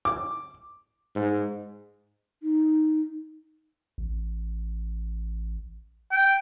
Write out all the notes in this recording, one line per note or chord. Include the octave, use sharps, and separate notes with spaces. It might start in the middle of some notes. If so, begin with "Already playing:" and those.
D6
G#2
D#4
A1
G5